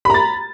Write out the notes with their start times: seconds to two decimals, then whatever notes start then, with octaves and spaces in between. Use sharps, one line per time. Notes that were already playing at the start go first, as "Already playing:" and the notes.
0.05 B5
0.10 A#5
0.14 A6